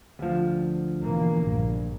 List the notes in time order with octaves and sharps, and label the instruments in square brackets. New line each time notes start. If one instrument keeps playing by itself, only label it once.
[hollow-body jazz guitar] D2 F3
[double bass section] B2 E3 A#3
A#1 G2